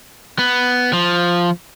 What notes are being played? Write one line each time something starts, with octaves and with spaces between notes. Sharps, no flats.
B3
F3